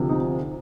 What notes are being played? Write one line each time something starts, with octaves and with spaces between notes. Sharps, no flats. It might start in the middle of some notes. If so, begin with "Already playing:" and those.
Already playing: D2 C3 F3
D#4